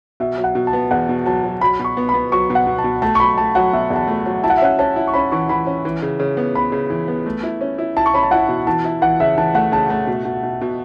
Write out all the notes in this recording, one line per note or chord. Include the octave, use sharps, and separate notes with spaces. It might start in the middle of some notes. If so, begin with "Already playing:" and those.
B2 E5
F#3
F#5
B2
A5
B3
E2 F#5
B2
F#3 A5
F#3
F#3 B5
B2 C#6
B3
B5
B3
F#3 C#6
B2
F#5
B2
A5
B2
A3 A5
C#6
F#3 B5
A3 A5
F#3 F#5
B2 E5
E2
A5
A3
F#3
E4 A5
F#5
E5
C#4 F#5
C#4 A5
E4
C#6
C#4 B5
E3 C#6
E3 B5
C#4
E3
C#3
C#3
B3
B3 B5
C#3
E3
B3
A3
E4
C#4
E4
E4 A5
C#6
C#4 B5
A5
E4 F#5
B2
E3 A5
E4
E3 F#5
C#3 E5
E3 A5
A3 F#5
C#3 A5
A3 A5
B2
B2
B2
B2